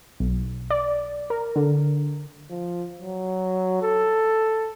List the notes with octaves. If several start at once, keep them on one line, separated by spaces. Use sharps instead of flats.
B1
D5
A#4
D3
F3
F#3
A4